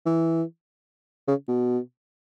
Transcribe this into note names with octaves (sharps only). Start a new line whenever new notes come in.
E3
C#3
B2